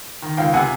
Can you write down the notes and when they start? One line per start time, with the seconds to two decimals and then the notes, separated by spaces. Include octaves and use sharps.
0.22 D#3
0.37 C#2 F5 G5
0.53 C3 F#5 G#5